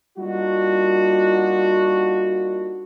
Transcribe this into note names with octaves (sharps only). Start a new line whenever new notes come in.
G3 A#3 D4 D#4 F4 F#4